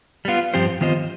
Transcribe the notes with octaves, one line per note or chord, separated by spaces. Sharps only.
G3 B3 F4
G2 F3 C4 G4 C5
D#3 B3 F4 C5 D#5